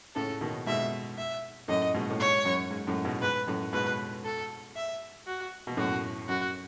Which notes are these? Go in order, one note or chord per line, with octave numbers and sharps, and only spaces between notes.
A2 C#3 A4
B2 D#3
G#2 B2 E5
E5
F#2 A2 D#5
G#2 B2
A2
G#2 C#5
F#2
G#2
F#2 A2
G#2 B2
G#2 B4
F#2 A2
G#2 B2 B4
A4
E5
F#4
B2
F#2 A2 F#4
F#2 F#4